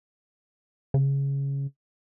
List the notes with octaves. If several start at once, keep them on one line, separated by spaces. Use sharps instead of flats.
C#3